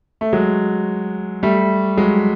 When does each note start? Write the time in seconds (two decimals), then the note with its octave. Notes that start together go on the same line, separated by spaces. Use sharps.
0.21 A3
0.33 F#3 G#3
1.43 G3 A3
1.97 F#3 G#3